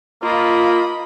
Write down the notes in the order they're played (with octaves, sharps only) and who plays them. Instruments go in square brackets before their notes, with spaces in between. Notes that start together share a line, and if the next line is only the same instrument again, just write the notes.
[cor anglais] A#3 [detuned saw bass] F4 [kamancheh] D#5 B5